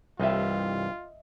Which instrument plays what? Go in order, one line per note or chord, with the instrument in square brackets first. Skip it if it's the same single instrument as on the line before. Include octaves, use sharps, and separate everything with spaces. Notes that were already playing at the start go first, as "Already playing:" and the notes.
[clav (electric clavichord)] C2 [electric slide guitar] G2 E3 G4 [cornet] F4 [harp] D#5 E5